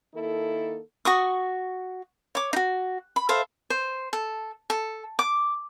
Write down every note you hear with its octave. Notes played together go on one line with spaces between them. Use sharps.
D#3 A#3 E4 A4
F#4 C#6 D#6
C#5 D6
D#4 F#4
B5
A4 C5 E5 F5
C5
A4
A4
D6